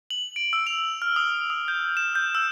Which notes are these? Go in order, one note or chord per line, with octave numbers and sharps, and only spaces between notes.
F#7
D7
E6
F7
F6
D#6
D#6
G6
E7
G6
E6